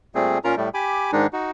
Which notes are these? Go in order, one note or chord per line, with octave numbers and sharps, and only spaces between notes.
A#2 G3 A3 C4 G#4
A#2 C#4 F4 A#4 A#5
A2 G3 A3
G4 G#5 B5 D6
G#2 D#3 G#3 D4 D#4
D#4 F#4